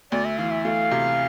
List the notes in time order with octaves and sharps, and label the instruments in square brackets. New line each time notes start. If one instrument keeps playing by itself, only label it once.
[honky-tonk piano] D2 [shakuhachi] D5
[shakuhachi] E5
[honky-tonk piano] E3 [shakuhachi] F5
[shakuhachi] E5
[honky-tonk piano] A3 [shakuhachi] F5
[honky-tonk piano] C3